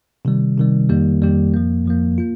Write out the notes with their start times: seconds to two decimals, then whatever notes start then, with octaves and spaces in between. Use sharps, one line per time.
0.25 C3 D#3 G3
0.57 C3 D#3 G3
0.89 F2 D#3 G3 A#3 G4
1.22 F2 D#3 G3 A#3 G4
1.53 F2 F3 A#3
1.86 F2 F3 A#3
2.18 A#3 F4